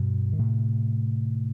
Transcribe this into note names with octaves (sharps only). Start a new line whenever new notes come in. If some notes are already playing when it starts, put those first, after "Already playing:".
Already playing: G2 B2
D#3
A2 C3